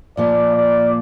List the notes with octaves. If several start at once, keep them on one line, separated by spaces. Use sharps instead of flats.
A#2 F3 A#3 D5
D5